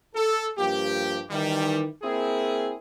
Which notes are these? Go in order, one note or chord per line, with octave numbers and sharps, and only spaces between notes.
A4
G2 F3 A#3 G4
D#3 E3 G3
A#3 C4 E4 G#4